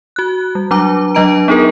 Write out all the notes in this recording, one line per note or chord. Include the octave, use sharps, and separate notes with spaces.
F#4 F#6
G3
F#3 D4 A#5 D6
F#3 D4 D#5 A#5 D7
B3 D#4 G#4 A#4